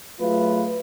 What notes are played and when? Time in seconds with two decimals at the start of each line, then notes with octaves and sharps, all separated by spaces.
0.20 F#3 A3 F4 G#4 B4